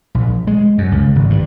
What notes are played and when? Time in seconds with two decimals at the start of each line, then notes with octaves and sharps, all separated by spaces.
0.15 A#1
0.47 G#3
0.78 F#2
0.92 C#2
1.16 G#1
1.30 G2